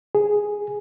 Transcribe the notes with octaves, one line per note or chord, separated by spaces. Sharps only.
G#4